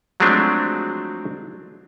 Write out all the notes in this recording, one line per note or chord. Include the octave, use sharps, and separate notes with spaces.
F3 F#3 G#3 A3 C4 D4